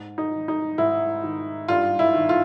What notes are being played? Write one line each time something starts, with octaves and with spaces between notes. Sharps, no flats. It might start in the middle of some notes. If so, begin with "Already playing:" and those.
Already playing: G#2
D#4
D#3
D#4
G#2 E4
D#3
G2 F4
E4
D#3
F4